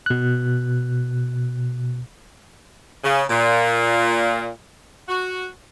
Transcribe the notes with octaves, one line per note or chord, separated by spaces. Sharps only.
B2 F#6
C#3
A#2
F#4